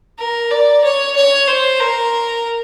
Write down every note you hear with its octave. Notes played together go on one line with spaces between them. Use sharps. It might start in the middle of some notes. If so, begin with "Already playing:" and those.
A#4
D5
C#5
C#5
C5
A#4